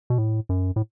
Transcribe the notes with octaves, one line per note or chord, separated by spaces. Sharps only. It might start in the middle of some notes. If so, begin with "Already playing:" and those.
B2
A2
F#2
A2